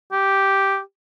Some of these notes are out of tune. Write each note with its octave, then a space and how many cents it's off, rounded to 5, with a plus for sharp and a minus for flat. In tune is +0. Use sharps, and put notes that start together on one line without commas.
G4 -5